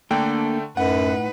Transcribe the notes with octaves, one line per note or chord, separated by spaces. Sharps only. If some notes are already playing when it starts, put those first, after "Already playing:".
D3 A3 A#3 D4 A4 G5
F#2 A2 D#4 B4 F#5